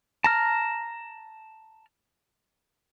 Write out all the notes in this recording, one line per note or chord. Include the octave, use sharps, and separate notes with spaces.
A5 A#5 F6